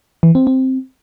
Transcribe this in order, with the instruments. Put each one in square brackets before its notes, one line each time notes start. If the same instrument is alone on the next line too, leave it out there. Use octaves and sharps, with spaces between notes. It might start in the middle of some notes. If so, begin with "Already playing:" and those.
[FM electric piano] E3
C4
C4